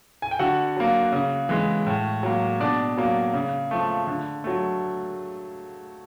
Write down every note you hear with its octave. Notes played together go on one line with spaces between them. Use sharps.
G#5
G5
D3 F#4 F#5
F#3 A#3
C#3
E3 G#3
A2
F#3 A#3
B2 D4 D5
F#3 A#3
C#3
F3 A3
D3
F#3 A3